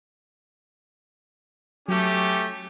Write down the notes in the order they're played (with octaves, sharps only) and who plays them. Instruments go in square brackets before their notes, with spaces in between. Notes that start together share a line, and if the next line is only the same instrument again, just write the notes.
[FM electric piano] F#3 [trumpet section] A3 C#4 G4